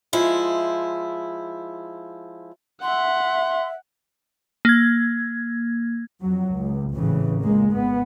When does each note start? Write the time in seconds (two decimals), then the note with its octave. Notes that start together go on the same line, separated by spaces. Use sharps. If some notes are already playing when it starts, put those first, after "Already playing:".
0.13 F3 G#3 E4
2.82 E5 F#5 C6
4.65 A#3 G#6
6.22 F2 F#3
6.55 C#2
6.96 G#1 A2 C#3 E3
7.42 C#2 G#3 A#3
7.71 G#1 B3